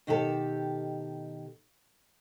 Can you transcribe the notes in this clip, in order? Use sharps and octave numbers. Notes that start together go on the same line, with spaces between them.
B2 D#3 G4 A4